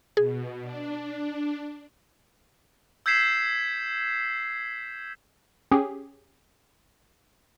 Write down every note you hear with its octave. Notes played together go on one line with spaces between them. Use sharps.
B2 G#4
D4
E6 G6 G#6 B6 C7 E7
C#4 G4 G#4